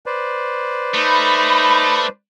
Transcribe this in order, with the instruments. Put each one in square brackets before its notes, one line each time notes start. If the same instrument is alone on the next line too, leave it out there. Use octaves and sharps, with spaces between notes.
[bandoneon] B4 C5 D5
[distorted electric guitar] A3 [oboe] D#4 [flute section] B5